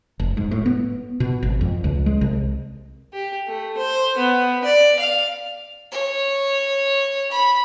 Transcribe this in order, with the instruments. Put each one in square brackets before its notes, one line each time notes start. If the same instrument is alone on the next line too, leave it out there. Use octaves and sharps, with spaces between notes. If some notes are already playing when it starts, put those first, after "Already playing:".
[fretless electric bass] F1
G#2
A2
B3
B2
G#1
F2
C#2
G#3
C2
[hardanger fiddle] G4
A3
C5
B3
D5
F5
[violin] C#5
B5